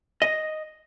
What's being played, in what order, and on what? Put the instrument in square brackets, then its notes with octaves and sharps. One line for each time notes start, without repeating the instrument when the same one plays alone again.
[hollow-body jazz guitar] D#5